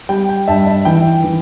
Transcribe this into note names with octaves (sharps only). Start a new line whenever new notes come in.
G3 G5
G5
G2 E5 A5
E5
E3 G5
E3